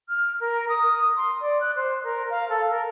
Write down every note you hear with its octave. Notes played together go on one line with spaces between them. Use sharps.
F6
A#4
D#6
C6
D5
F#6
C5
A#4
F5
A4
A#4